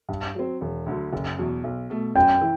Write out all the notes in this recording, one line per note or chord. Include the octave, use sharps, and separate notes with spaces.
G2
F#3 C4
E1
D2 D3 F#3
F#1
E2 B2 F#3
B1
B2 A3
F#2 G5
E3